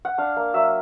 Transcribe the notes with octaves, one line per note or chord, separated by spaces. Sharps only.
F#5
D4 F5
A#3
F#3 E5